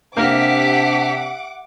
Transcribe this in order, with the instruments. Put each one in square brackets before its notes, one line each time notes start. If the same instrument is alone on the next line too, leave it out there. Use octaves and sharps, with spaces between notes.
[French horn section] C3 D4 [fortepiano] A#3 [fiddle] G4 E5 [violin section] F#5 D6